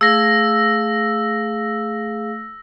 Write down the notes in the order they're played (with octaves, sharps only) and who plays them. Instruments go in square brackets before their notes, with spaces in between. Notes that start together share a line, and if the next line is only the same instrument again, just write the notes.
[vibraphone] A3 G#4 F5 [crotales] E6 A#6